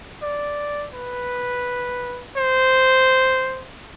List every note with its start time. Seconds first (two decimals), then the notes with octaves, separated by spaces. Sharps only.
0.22 D5
0.94 B4
2.37 C5